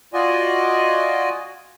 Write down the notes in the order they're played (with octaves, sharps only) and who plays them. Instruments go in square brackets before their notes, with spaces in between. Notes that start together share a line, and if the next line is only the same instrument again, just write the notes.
[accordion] F4 F#4 D5 D#5 G#5